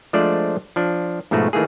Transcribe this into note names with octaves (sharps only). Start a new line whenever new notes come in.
F3 G#3 A3 D4 C5 D5
F3 D4
G#2 B2 F3 A3 F#4
D#3 E3 A3 A#3 G#4